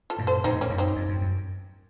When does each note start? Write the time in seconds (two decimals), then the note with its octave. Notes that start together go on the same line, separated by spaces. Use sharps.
0.10 F4 A4
0.19 F#2 A#2
0.27 A4 C5
0.44 F2 A2 C4 D#4
0.61 A#3 C#4
0.70 F#2
0.78 C4 D#4
0.96 F2
1.09 F#2
1.21 F#2